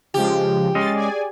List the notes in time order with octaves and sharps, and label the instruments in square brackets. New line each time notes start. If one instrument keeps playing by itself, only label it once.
[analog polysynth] C#3 F3 G#3 [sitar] G4
[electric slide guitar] G#3 C#4 D#5 [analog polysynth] C6 A6
[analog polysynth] G#4 D5 G#5